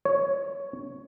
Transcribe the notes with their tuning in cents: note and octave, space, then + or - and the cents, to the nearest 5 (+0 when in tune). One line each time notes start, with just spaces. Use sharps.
C#5 +5